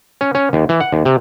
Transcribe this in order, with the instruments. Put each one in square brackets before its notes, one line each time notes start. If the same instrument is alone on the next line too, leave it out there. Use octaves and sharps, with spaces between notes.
[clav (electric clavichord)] C#4
C#4
D#2
E3
F#5
D#2
C3